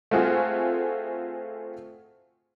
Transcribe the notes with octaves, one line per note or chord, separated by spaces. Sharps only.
A3 C4 F4 F#4 G#4